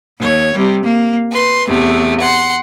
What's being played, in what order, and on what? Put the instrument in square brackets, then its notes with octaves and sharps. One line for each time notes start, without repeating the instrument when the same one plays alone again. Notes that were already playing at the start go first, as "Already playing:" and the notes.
[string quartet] D#2 C#5
C3 G3
A#3
B4 C6
E2 C3 A3
F#5 C6